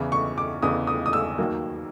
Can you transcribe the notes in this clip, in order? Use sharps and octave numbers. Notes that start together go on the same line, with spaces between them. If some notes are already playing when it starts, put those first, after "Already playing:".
Already playing: E2 C#3 E3
C#6
D6
E2 C#3 E3 D#6
D#6
D#6
E6
D#2 D#3 F#3 A#3